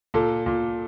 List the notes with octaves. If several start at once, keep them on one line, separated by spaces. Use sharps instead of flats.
A#2 A4
A#2